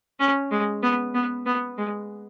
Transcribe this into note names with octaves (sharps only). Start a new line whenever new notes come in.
C#4
G#3
B3
B3
B3
G#3